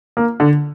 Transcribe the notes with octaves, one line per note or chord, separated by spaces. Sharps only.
A#3
D3